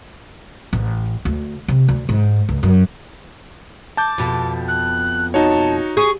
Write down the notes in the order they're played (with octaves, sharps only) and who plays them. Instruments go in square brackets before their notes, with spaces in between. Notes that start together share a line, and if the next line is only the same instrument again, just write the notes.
[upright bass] A1
D2
C3
D2
G#2
C#2
F#2
[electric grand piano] A5 G6 [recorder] D6
[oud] F2 B2
[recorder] F#6
[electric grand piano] D#4 F#4 C#5 [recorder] A5
[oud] G#4 [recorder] C#6